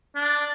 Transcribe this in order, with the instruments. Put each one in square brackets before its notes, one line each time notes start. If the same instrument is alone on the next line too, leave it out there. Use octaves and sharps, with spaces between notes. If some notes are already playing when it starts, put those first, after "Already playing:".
[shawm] D4